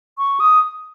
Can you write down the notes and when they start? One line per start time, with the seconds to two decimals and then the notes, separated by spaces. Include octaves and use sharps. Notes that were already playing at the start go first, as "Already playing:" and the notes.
0.18 C#6
0.40 D#6